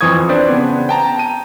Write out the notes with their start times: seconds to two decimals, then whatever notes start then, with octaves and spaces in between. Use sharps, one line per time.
0.01 F2 E3 C5 C#6 D#6 G#6
0.29 C4 D4 B4 C5 D5
0.49 C#3 B3
0.89 G5 A5 A#5
1.18 G5 D#7